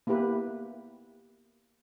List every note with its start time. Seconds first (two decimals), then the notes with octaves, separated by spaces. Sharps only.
0.07 A#3 B3 E4 G4 B4